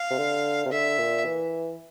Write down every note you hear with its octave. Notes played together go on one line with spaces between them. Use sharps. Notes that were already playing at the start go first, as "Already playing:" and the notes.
Already playing: F5
C3
D3
C3
D3 E5
A#2
E3